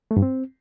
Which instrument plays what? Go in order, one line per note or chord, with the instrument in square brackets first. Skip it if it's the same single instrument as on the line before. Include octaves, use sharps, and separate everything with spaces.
[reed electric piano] A3
G2
C4